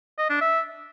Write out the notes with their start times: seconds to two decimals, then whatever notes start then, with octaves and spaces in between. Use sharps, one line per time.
0.18 D#5
0.30 D4
0.41 E5